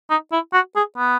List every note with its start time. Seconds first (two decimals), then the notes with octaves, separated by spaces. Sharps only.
0.10 D#4
0.32 E4
0.53 F#4
0.76 G#4
0.98 B3